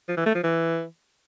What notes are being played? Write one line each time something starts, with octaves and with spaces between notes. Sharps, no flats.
F3
E3
A3
F3
E3